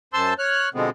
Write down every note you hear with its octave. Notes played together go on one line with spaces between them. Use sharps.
F#2 C5 A5 C6 E6
C#5 F6 F#6
B2 D3 F3 G#3 B3 C4